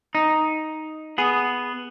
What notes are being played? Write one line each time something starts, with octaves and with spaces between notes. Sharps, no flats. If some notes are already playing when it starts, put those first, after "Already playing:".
D#4
B3 G#4